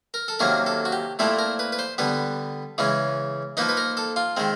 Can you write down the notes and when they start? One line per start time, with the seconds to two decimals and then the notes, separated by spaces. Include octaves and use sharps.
0.14 A#4
0.28 A4
0.39 C3 D#3 F#3 A#3 C#4 A#4
0.66 A4
0.85 F#4
0.92 G4
1.19 A#2 F3 A3 C4 E4 A4
1.39 A#4
1.59 B4
1.72 B4
1.79 C5
1.98 D3 G3 B3 B4
2.78 C#3 E3 G#3 C#4
3.57 F3 A#3 D#4 B4
3.69 B4
3.77 A#4
3.97 A4
4.16 F4
4.37 D#3 G#3 C4